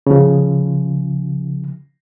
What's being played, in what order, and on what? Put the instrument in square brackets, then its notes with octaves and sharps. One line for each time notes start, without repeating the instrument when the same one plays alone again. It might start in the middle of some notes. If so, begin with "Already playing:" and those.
[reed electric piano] C#3 F3